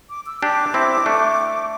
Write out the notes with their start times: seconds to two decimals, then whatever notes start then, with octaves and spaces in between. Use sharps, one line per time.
0.10 D6
0.26 E6
0.41 D4 G4 D6
0.74 C4 E4
1.06 A3 D4